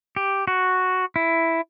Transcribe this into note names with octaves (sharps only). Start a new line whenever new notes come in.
G4
F#4
E4